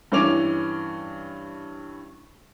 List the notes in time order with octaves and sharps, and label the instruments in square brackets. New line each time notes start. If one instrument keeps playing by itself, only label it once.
[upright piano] G2 E3 C#4 D6 F7